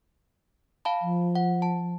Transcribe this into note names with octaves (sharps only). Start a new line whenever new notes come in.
F5 A5 B5
F3
F#5
A5